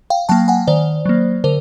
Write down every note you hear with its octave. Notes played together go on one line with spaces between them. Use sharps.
F5 G5
F#3 A#3 G5 A5
F#5 G#5
D#3 C5 D5
F#3 A#3
D3 A#4 C5